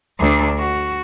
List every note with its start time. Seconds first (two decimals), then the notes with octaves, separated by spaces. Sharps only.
0.19 D2 D4
0.58 F#4